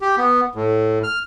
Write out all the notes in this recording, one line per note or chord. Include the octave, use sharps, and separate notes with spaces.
G4
B3
A2
F6